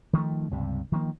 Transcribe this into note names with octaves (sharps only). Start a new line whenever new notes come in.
D#3 F3 G#3 A3
C#2 G2 C3 G3
D#3 F3 A#3